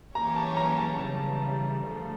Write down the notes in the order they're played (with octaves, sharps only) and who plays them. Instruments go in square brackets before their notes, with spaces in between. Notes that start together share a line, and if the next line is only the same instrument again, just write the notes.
[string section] E3 A#3 C#4 G4 C#5 [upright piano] A#5
[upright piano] A5
A#5
A5
[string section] C#3 E3 G3 [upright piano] A5
[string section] D3 F3 A3